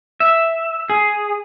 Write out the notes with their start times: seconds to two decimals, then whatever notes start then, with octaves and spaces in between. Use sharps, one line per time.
0.20 E5
0.90 G#4